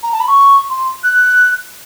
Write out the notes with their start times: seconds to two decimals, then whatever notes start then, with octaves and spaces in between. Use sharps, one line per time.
0.03 A#5
0.12 A5
0.20 B5
0.28 C#6
0.70 C6
1.03 F#6